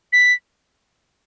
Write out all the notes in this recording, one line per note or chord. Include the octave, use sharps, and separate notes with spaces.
B6